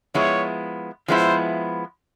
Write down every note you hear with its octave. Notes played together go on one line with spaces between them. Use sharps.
F3 G#3 B3 E4 C#5
F3 G#3 B3 E4 C5